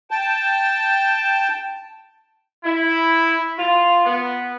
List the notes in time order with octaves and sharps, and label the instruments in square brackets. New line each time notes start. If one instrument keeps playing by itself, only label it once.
[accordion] G5 A5
[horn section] E4
F4
B3